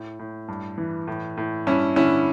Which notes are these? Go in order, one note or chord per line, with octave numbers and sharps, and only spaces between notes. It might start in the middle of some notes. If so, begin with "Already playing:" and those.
Already playing: A2
A2
G2
E3
A2
A2
G2 C#4 E4
D3 C#4 E4